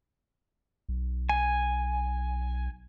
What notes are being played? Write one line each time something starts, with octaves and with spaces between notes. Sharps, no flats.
B1
G#5